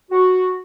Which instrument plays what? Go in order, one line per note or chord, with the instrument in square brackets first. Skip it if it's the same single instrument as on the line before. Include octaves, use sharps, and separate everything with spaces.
[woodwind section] F#4